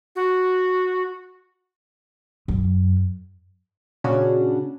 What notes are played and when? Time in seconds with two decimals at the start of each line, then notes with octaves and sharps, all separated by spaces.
0.16 F#4
2.48 F#2
4.04 A#2 C#3 C#4 D4 F#4